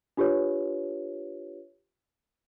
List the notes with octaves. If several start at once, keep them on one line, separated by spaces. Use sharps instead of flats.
D4 F4 G4 B4 C#5